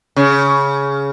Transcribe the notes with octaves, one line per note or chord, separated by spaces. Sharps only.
C#3